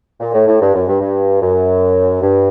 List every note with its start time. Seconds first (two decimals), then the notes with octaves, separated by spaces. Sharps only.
0.20 A#2
0.33 A2
0.47 A2
0.60 G2
0.74 F#2
0.87 G2
1.01 G2
1.41 F#2
2.21 G2